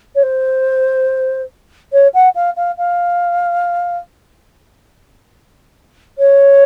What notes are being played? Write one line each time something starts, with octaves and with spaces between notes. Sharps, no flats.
C#5
C5
C#5
F#5
F5
F5
F5
C#5